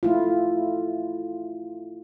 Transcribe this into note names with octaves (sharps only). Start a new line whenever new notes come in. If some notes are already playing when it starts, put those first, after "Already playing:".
A3 E4 F4